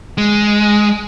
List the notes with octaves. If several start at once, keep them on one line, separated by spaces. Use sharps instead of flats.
G#3